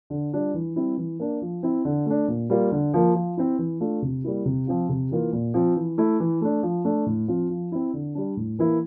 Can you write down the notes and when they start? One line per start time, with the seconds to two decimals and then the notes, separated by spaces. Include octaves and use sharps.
0.10 D3
0.33 G3 D4 F4
0.54 E3
0.76 G3 C4 E4
0.97 E3
1.20 A#3 D4
1.42 F3
1.63 C4 E4
1.85 D3
2.06 A3 D4
2.28 A#2
2.50 G3 A#3 F4
2.72 D3
2.94 F3 A#3 F4
3.15 F3
3.37 C4 E4
3.59 E3
3.80 A3 D4 F4
4.02 C3
4.24 G3 A#3 E4
4.45 C3
4.67 F3 C4 F4
4.89 C3
5.11 E3 A#3 F4
5.33 A#2
5.54 F3 C4 F4
5.76 E3
5.98 A3 E4
6.20 E3
6.41 A3 D4
6.63 F3
6.85 A3 D4
7.06 A2
7.28 F3 C4 F4
7.50 F3
7.72 C4 E4
7.93 D3
8.15 G3 D4
8.37 A2
8.59 E3 A#3 E4